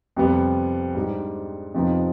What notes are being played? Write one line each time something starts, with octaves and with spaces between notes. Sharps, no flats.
F2 C3 G3 B3
G#2 G3 D4
F2 C3 F3 B3 D#4